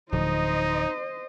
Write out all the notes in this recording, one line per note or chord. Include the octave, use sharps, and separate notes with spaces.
D1 D3 F3 D#4 C5 D#5